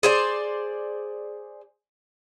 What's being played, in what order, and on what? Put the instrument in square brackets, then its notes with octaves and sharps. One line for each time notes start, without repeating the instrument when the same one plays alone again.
[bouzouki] G#4 C5 D5